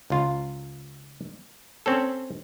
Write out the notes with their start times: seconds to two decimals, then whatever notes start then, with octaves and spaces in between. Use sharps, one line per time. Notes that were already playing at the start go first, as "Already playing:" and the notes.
0.10 C#2 F4
1.86 C4 C#4 A4